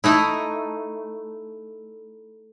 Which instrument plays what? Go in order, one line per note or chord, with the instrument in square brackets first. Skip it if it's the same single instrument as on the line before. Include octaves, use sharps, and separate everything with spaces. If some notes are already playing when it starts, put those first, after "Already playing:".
[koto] A3 D#4 E4